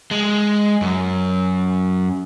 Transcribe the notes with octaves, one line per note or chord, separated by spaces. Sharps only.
G#3
F#2